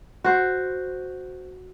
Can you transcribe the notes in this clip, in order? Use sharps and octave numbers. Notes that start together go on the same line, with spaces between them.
F#4 C5